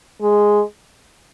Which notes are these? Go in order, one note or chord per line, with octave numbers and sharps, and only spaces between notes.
G#3